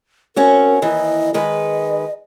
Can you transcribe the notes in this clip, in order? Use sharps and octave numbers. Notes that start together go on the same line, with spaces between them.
C4 C#4 F#4 A#4
D#2 E3 D#5
D#3 G#3 B4 D#5